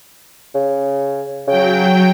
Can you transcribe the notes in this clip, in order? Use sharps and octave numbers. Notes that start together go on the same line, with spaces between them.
C#3
C#3 F#3 G5